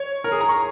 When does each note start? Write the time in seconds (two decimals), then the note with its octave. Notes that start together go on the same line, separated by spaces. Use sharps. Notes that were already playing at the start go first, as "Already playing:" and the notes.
Already playing: C#5
0.24 A#4
0.32 G#4
0.40 A#5
0.49 C#6